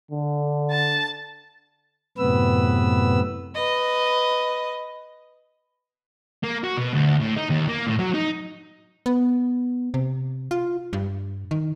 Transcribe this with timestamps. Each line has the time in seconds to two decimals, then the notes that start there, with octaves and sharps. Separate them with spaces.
0.11 D3
0.71 A5
2.18 F#2 A2 C3 B3 B4 E6
3.55 B4 D#5
6.44 A#3
6.64 F#4
6.78 B2
6.93 D2
7.20 A2
7.36 D#4
7.50 D#2
7.69 A#3
7.87 A2
7.99 F#3
8.14 D#4
9.06 B3
9.94 C3
10.51 F4
10.93 G2
11.51 D#3